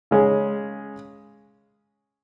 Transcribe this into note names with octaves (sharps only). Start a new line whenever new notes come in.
C#3 G#3 C#4 G#4 C#5